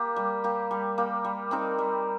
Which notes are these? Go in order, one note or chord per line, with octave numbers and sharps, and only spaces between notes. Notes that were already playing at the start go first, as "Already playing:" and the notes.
Already playing: A#3 G4
G3
A#3 G4
G3
A#3 G4
G3
C4 D#4 A#4
G3